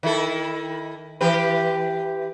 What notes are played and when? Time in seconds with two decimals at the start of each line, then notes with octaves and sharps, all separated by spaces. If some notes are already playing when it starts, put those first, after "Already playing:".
0.03 D#3 E4 A4
1.21 E3 G4 B4